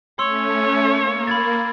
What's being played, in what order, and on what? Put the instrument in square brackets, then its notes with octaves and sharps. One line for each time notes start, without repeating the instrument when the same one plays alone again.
[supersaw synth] A3 C#4 [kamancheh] C#5 [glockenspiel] C6 E6
[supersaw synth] A#3
[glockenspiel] B5 G#6 A6